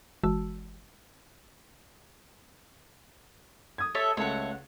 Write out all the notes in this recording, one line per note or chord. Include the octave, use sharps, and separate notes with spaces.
G1 E3 G#3 F#4 A5 E6
D#6 G#6
A4 C#5 E5
C#2 A3 A4 C#5 F#5